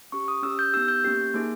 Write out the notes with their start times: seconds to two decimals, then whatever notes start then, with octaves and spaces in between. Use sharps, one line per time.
0.12 C#4 G4 C#6
0.28 D#6
0.43 C#4 G4 E6
0.59 G6
0.73 B3 D#4 G4 E6
0.88 G6
1.04 A#3 C#4 G4
1.34 A#3 D#4 G#4